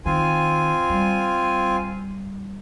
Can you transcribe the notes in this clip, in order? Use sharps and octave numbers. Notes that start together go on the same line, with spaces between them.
D#3 C4 F4 G#5
G3